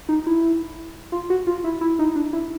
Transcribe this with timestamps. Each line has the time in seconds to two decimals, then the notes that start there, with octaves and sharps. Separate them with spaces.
0.09 D#4
0.27 E4
1.12 F4
1.30 F#4
1.47 F4
1.64 E4
1.81 E4
1.99 D#4
2.15 D4
2.33 E4